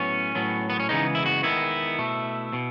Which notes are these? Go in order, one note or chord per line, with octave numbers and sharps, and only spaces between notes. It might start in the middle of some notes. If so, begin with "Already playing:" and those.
Already playing: A2 F#3 B3 C#4
A2 F#3 B3
B3
C#4
C#3 E3 G#3 B3 D#4
E4
F#4
D#3 G#3 B3 E4
B2 A3
B2